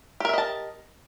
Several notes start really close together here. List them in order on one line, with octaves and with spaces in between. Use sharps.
G4 A#4 E5 D#5 A5